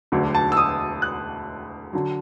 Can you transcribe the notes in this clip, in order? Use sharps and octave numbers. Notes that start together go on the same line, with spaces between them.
E1 D2 D3 F#3
A5
E6
D#6
F#6
D3 F#3